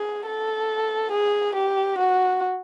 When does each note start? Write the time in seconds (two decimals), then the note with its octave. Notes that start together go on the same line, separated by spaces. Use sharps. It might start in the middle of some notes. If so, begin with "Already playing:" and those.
Already playing: G#4
0.26 A4
1.12 G#4
1.55 G4
1.98 F#4